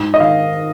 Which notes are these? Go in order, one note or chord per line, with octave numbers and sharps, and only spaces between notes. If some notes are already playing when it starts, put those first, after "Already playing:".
Already playing: G#2
D#5
D#3 F5